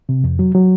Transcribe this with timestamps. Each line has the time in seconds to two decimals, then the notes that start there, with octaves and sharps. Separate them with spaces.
0.09 C3
0.24 F2
0.39 F#3
0.55 F#3